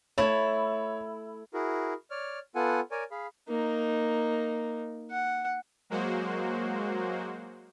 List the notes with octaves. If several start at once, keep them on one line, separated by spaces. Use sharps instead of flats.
A3 E4 C#5
E4 F#4 G#4 A#4
C#5 D5 F6
B3 F4 A4 F#5 G#5
A#4 C#5 D5 G#5
G#4 F5 B5
A#3 D#4
F#5
F#3 G#3 A#3 F#4 C5